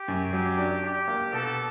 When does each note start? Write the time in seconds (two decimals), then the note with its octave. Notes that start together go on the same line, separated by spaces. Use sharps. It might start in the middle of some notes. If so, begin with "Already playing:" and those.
Already playing: G4
0.08 F#2
0.33 F#3 G4
0.58 D4
0.83 D4 G4
1.08 A#3
1.33 B2 A4